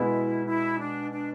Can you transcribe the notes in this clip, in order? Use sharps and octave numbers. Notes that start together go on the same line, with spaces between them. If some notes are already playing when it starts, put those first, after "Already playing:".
Already playing: B2 G#3 B3 E4
E4
D4
D4